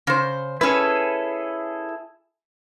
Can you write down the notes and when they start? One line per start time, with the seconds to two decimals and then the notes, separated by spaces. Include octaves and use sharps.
0.07 C#3 C5
0.61 C#4 E4 G#4 A4 B4